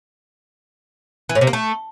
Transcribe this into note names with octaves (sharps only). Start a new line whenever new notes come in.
E3
A2
C3
A#3
A3